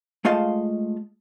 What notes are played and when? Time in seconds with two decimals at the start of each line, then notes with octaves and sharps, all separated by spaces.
0.25 G#3 A3 F4 D#5 F5 A5